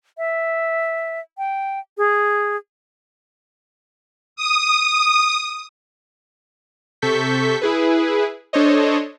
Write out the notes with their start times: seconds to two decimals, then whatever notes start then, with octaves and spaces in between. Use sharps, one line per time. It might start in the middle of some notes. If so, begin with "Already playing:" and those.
0.18 E5
1.38 G5
1.98 G#4
4.36 D#6
7.02 C3 A4 C#6 G6 B6
7.62 E4 G#4 B4
8.53 D4 A4 C5 C#5 D#5